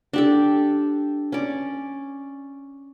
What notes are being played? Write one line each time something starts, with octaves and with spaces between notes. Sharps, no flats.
D4 G4 A4
C#4 D5